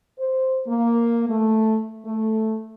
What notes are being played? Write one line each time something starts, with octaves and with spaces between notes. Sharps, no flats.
C5
A#3
A3
A3